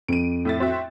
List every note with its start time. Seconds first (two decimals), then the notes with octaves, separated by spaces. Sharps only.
0.08 F2 D7 D#7
0.45 A2 E5 A6
0.60 C4 F#4 E5